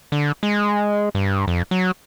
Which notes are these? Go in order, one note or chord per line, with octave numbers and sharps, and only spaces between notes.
D3
G#3
G2
F2
F#3